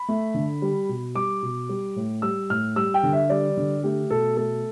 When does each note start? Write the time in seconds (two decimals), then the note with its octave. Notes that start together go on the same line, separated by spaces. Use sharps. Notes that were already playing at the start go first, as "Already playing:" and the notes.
Already playing: B5
0.09 A3
0.34 D3
0.62 G3
0.89 B2
1.15 G3 D6
1.43 B2
1.69 G3
1.96 A2
2.22 G3 E6
2.50 A2 F6
2.76 G3 E6
2.94 G5
3.03 D3
3.13 E5
3.30 G3 D5
3.57 D3
3.84 A3 G4
4.10 B2 A4
4.37 A3 A4